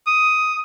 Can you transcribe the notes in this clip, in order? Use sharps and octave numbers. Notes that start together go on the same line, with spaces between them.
D#6